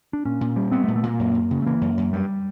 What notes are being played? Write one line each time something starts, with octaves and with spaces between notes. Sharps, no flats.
D4
A#2 C#4
A#2
G3
B3 C4
A3
A#2
A3
A#2 A#3
F#2
F#2
C#3
A3
E3 A#3
F#2
F#2
G2 G3